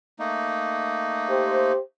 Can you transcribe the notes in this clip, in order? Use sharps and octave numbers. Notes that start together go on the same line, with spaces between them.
A3 A#3 D#4
G4 C5